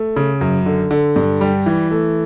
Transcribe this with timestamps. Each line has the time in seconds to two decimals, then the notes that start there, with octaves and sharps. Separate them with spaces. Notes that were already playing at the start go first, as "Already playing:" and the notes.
Already playing: A3
0.16 C#3
0.41 F#2
0.66 D3
0.91 D3
1.16 G2
1.41 G3
1.66 E3
1.91 A3